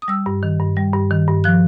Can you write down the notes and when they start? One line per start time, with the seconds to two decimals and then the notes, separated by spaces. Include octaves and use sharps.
0.02 D#6
0.08 G3 E6
0.26 G2
0.43 D#3
0.60 G2
0.77 G3
0.94 G2
1.11 D#3
1.28 G2
1.44 F3 F#6